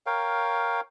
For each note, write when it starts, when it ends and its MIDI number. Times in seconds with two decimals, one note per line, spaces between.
0.06 0.81 70
0.06 0.81 73
0.06 0.81 77
0.06 0.81 79